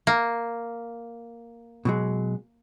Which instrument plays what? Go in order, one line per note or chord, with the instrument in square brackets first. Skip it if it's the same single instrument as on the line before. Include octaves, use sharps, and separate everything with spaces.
[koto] A#3
[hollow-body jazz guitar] B2 F#3 G#3